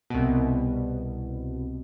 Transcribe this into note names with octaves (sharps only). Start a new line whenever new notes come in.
C2 B2